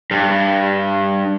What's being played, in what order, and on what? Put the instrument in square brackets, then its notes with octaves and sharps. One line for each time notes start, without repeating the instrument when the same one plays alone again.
[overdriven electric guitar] G2